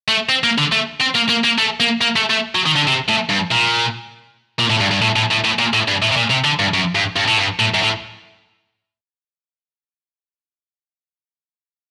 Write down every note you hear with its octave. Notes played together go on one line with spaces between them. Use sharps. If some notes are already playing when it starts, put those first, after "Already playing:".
A3
C4
A#3
D3
A3
C4
A#3
A#3
A#3
A3
A#3
A#3
A3
A3
F#3
D#3
D3
C3
A2
G2
A#2
A#2
A2
G2
G2
A2
A2
A2
A2
A#2
A2
G2
A2
C3
A#2
C3
D3
G2
F#2
G2
G2
A2
G2
A2
F#2
A2